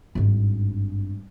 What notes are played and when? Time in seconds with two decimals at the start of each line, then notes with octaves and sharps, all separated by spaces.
0.15 G#1 G2